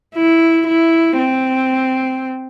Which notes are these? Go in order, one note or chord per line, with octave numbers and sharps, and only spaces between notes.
E4
E4
C4